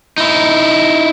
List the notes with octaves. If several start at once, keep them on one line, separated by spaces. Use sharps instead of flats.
D#4 E4